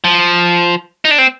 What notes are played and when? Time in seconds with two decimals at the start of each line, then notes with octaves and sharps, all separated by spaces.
0.04 F3
1.05 D#4
1.11 D4
1.18 C4